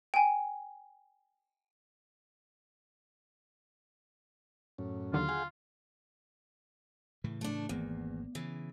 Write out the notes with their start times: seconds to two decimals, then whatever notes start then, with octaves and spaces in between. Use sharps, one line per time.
0.14 G5 G#5
4.78 F#2 A2 C#4
5.13 D#2 D3 F#3 F4
5.29 G#4 F5 F#5 G#5
7.24 A2 C#3 E3
7.41 A3 D4
7.69 G#1 E2 A#3
8.35 C#3 E3